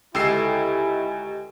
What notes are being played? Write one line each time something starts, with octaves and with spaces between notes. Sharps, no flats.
C#2 D3 E4 G4 D#5 G#5 E6 C7